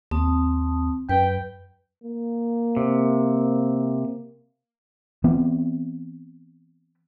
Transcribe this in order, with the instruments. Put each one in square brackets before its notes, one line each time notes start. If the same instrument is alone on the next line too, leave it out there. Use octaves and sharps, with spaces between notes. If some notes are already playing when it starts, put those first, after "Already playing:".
[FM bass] D#2 [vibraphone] C4 A5 D#6
[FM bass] F#2 [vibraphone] B4 [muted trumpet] G5
[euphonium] A#3
[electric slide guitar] C3
[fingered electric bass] E3 B3 C4